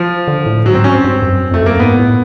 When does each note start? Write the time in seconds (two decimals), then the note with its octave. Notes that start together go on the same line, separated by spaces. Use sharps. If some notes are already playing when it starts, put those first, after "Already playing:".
Already playing: F3
0.28 D3
0.46 A2
0.65 G#2 F#3
0.74 C4
0.84 C#4
0.94 C4
1.04 G2
1.22 F#2
1.51 F2 A3
1.61 F#2
1.66 A#3
1.80 G#2 B3
1.99 A2